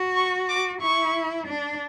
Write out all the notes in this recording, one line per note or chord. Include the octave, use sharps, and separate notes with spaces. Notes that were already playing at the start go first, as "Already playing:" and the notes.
Already playing: F#4
C#6
D6
E4 C#6
D4